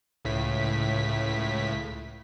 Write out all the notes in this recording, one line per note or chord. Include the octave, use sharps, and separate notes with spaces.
C#2 A2 B6